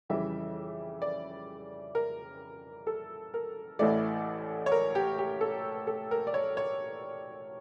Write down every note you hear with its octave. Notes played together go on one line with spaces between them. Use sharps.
F2 C#3 E3 G3 E5
D5
A#4
A4
A#4
A1 A2 E3 A3 D5
C#5
A#4
G4
G4
A4
A4
A#4
D5
C#5
C#5